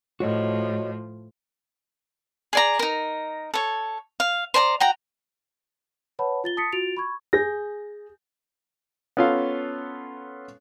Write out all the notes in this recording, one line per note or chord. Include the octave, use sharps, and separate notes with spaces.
A2 F3 F#4 C#5 D#5
G#4 D5 A#5
D#4 A#4
A4 C#5
F5
C5 D5 A5 A#5
F#4 G5 A#5
B4 C#5 F#5 A5 B5
F4 A6 G7
A5 D#6 A6 B6 C#7
F4 F#4 A6 D7 F7
B5 C#6 G#6
G#4 G6 A#6
B3 C#4 F4 A4 F5